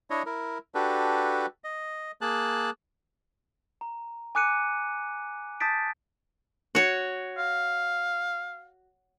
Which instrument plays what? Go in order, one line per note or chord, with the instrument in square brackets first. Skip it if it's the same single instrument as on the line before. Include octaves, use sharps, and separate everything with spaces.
[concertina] D4 E4 C#5 D#5
E4 A#4
D4 F#4 G4 A4 B4
D#5
A#3 G#4 A5 F#6
[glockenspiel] A#5
G#5 D6 F#6 C#7 D#7
A5 D#6 G6 A6 B6 D7
[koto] F#4 C#5
[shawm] F5